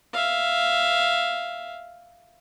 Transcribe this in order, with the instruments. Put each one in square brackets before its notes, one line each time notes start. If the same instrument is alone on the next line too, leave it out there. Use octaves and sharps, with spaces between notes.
[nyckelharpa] E5 F5